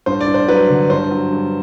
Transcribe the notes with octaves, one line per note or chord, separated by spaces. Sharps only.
G2 C5
D5
G2
C5
F#3 B4
D3
G2 C5
F#3
G2